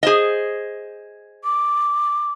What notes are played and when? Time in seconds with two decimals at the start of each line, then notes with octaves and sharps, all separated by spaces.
0.03 G#4 C5 D#5
1.44 D6